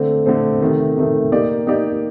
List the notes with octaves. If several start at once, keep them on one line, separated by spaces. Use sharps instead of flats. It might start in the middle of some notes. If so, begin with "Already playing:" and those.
Already playing: D3 A3 C4
D3 A3 C4
C3 D#3 A3
C3 D#3 A3
A#3 D#4 G4 D5
A#3 D#4 G4 D5